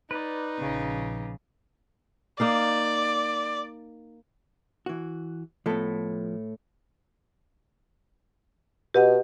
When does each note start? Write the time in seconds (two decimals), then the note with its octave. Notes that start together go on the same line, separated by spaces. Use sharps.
0.11 D#4 B4 D5
0.59 A#1 A#2 C#3 F3
2.40 A#3 D#4 D5 F5
4.86 E3 F#4
5.66 A2 F3 B3 A4
8.94 B2 G4 D#5 F#5